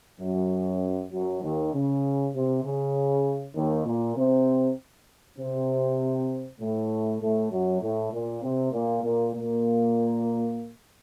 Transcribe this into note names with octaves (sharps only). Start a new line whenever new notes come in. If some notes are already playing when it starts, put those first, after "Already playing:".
F#2 F#3
F#2 F#3
D#2 D#3
C#3
C3
C#3
D#2 D#3
A#2 A#3
C3 C4
C3 C4
A2 A3
A2 A3
F#2 F#3
A2 A3
A#2 A#3
C3 C4
A#2 A#3
A#2 A#3
A#2 A#3